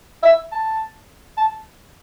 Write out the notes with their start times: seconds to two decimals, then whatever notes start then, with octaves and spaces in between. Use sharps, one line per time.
0.23 E5
0.52 A5
1.38 A5